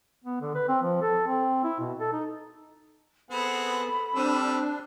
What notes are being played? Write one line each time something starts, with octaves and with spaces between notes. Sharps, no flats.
B3
D3
B4
C4
F3
A4
C4
E4
B2
A4
D#4
B3 C4 G#4 A4 F#5 B5
G3 C4 D4 E6